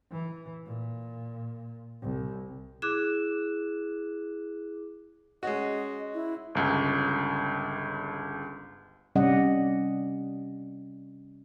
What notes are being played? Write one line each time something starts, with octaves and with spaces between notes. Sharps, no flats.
E3
A#2
C2
E4 G#4 D6 F#6 E7
G#3 C#4 F#4 D#5
E4
G1 C#2
C3 G3 C#4 D5 D#5 F#5